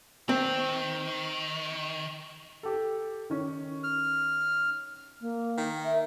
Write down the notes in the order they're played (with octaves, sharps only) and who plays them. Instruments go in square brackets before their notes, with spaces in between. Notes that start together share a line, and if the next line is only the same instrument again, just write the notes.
[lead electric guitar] D#3 [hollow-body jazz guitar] C4
[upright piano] G4 A4
D#3 C#4
[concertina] F6
[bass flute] A#3
[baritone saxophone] D#3
[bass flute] E5